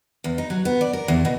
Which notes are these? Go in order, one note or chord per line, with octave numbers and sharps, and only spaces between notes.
E2
D#4
F#3
B3
D5
A#4
E2
B2